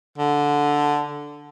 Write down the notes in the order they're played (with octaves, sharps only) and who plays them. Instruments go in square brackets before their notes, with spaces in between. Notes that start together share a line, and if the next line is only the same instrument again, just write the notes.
[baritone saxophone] D3